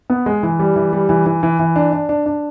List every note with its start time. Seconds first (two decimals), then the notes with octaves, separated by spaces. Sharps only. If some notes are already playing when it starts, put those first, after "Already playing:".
0.10 B3
0.26 G#3
0.43 E3
0.60 G3
0.76 E3
0.93 G3
1.09 E3
1.26 E3
1.43 E3
1.59 E3
1.76 D4
1.93 D4
2.09 D4
2.26 D4